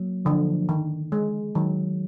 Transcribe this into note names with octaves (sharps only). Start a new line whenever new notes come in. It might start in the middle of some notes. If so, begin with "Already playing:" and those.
Already playing: F#3 A#3
D3 F3
D#3
G#3
D#3 F#3